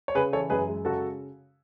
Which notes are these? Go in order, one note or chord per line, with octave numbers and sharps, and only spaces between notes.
C#5
C#3 G#4 B4
E3 A4 C#5
F#2 G#4 B4
G#3
C#3 F#4 A4